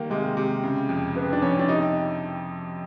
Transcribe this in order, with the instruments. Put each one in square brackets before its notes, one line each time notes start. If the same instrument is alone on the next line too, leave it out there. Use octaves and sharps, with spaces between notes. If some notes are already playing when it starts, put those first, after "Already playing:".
Already playing: [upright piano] D#3 G3 [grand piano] A#3
[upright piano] C3 [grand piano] G#3
[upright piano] C3
C#3
F2
[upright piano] C#3 [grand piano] B3
[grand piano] D4
[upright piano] F2 [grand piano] C#4
[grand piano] D4
[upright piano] C3 [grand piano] D#4